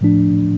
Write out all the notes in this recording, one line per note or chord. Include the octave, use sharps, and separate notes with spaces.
A2 F3 A3 D4